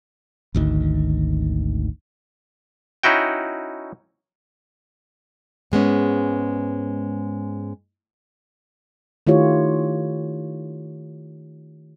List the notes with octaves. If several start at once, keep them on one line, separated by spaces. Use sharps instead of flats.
G#1 D2 D#3
C#4 D#4 E4 F#4 G5
G#2 G#3 B3 C#4
D#3 A3 E4 F4 G4 C#5